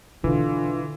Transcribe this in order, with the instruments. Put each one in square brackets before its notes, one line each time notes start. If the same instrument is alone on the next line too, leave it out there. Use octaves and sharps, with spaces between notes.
[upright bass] B2 [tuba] D3 [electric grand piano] E3 [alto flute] F4